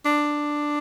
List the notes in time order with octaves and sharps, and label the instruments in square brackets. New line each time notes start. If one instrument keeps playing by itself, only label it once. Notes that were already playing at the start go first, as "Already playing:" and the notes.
[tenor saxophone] D4